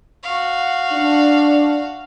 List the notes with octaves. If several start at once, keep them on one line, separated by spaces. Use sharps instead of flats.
F#4 F5
D4